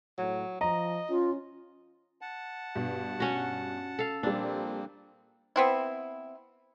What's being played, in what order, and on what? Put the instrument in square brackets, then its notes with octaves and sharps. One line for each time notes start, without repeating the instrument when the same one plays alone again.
[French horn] A2 [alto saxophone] F#3
[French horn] F3 [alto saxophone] D#5 [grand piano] A#5
[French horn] C#4 [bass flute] F4
[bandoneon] F#5 A5
[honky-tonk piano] G2 B2
[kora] C#4 F#4
A4 F5
[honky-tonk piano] A#2 G3 [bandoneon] F3 A#3 C4 [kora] D4
[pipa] B3 C4 E4